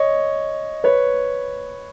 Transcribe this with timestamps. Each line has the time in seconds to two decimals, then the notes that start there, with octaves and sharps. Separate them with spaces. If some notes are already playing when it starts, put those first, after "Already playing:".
Already playing: C#5 D#5
0.84 B4 C#5